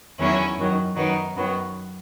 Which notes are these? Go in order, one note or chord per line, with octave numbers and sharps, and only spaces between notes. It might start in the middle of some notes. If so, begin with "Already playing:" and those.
E2 D#3 F#3 C#4 E4
F#2 D#3 F#3
F#2 D#3 F#3 B3 D#4
F#2 D#3 F#3 B3